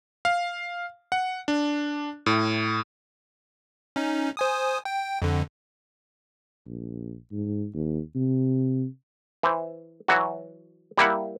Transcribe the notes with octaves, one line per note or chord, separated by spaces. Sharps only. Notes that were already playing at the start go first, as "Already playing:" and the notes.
F5
F#5
D4
A2
C#4 D#4
C5 G#5 D#6
G5
F2 D3
A#1
G#2
D#2
C3
E3 C5
E3 F#3 F#4
G3 A#3 E4 F#5